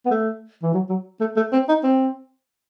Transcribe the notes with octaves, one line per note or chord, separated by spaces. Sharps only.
B3
A3
E3
F#3
F#3
A3
A3
C4
D#4
C4